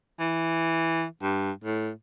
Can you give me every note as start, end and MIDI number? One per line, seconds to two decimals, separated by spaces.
0.20 1.04 52
1.22 1.51 43
1.64 1.91 45